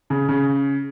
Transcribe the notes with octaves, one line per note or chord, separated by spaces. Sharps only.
C#3
C#3